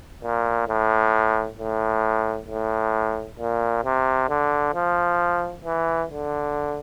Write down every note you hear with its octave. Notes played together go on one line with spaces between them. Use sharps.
A#2
A2
A2
A2
A#2
C3
D3
F3
E3
D3